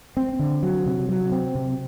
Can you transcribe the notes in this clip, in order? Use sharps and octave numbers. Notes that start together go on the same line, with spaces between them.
C4
D3
F#3
C3
F#3
C4
C3